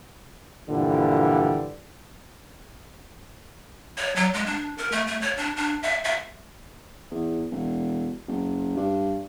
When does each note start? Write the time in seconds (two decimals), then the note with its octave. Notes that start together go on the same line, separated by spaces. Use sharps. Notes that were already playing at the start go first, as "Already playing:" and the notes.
0.69 G2 A#2 D3 E3 F3 G3
3.97 C#5
4.16 F#3
4.33 G#3
4.46 D4
4.78 A#4
4.92 A3
5.07 A3
5.21 C#5
5.37 D4
5.56 D4
5.83 E5
6.04 E5
7.11 E2
7.51 E1
8.28 F#1
8.76 G2